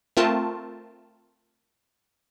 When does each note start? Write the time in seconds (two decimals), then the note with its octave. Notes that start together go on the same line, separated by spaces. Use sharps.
0.17 A3 C4 F4 A#4 A5